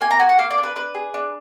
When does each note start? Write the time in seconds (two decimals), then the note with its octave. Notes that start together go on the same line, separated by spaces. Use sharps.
0.01 A#3 G#5
0.11 A#5
0.19 F#4 G#5
0.29 F#5
0.38 A#3 F5
0.51 D5
0.58 D4
0.63 B4
0.76 D4 B4
0.95 G#4
1.14 D4